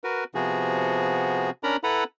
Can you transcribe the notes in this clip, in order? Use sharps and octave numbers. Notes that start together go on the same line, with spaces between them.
F#4 A#4 B4
C3 F3 B3 F#4 G#4
C#4 D4 A#4 A#5 B5
E4 A4 B4 F#5 A#5 B5